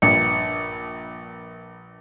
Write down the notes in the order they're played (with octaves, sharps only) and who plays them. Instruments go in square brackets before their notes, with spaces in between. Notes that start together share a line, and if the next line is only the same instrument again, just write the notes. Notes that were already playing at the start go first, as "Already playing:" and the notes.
[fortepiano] A#1 G2 [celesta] C#7